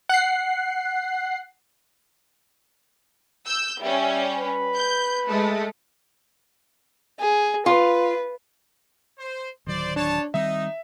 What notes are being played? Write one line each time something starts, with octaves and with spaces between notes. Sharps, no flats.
F#5 F#6 C7
E6 G6
G3 C#4 E5
B4
G6
G#3 A3
G#4
F4 B4
C5
D1 D#3 F#3 C5 D5
D4 C#5 A5
D#3 G3 C4 D#4 E5